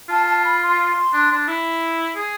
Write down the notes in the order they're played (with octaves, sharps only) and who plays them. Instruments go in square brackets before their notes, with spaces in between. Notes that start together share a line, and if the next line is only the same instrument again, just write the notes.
[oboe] F4 [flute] A5
[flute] A5
B5
C6
[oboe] D4
D4
E4
G#4